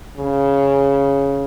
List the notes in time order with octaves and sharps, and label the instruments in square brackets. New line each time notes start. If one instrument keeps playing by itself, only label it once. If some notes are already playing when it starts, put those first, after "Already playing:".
[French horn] C#3